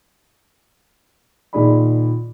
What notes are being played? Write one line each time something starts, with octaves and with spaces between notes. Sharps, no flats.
A#2 D#3 D#4 G#4 D5 B5